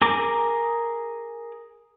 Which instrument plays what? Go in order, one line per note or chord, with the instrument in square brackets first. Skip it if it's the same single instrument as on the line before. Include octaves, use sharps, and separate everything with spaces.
[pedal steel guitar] G#4 A#4 D6